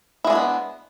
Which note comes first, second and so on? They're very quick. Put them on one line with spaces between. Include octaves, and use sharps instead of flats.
E4 G#3 D4 F#4 B3